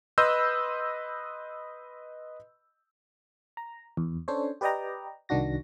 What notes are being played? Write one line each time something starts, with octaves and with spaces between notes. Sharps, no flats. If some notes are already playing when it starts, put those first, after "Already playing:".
B4 D#5 B5 C6 E6 G6
A#5
E2
C#4 D4 A4 C5 C#5
G4 B4 D5 D#5 G5 A#5
C2 D#3 D4 F#4 A#6